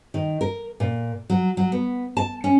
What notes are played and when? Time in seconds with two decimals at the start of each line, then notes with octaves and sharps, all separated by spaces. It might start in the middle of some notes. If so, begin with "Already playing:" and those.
0.14 D#3
0.41 A#4
0.80 A#2
1.30 F#3
1.57 F#3
1.72 B3
2.17 A5
2.44 C#4